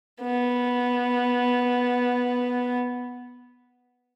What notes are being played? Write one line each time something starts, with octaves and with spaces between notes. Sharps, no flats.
B3